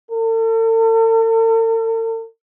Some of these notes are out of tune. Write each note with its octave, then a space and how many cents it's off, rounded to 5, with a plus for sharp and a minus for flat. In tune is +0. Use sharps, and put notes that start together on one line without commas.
A4 +45